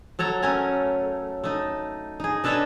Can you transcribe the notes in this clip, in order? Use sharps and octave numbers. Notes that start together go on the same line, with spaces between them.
F#3 A4 C#5 A#5
A3 C#4 A#4 G#5
A3 D#4
D#4 G#4
D4 A4 B4 C#5 D#5 E5